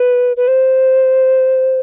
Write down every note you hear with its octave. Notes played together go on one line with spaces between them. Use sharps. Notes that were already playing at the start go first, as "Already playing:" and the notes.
Already playing: B4
B4
C5